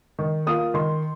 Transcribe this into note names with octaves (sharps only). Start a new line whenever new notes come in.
D#3
A#3 F4 D#6
D#3 C6